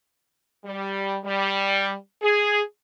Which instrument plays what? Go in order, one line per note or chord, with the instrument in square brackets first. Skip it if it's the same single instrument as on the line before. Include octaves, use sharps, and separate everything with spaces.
[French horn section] G3
G3
G#4